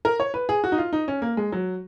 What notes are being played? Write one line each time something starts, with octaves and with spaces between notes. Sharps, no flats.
A#4
C#5
B4
G#4
F#4
D#4
F4
D#4
C#4
A#3
G#3
F#3